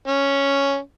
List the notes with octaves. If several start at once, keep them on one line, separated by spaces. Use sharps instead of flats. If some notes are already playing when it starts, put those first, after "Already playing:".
C#4